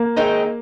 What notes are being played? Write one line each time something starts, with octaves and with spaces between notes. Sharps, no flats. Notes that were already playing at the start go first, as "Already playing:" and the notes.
Already playing: A#3
D#2 D#3 G#3 C4 D#4